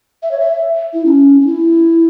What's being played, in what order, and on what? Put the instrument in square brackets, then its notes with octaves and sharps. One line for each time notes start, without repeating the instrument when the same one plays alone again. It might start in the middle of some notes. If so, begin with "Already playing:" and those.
[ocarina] E5
C#5
E5
E4
C#4
C#4
E4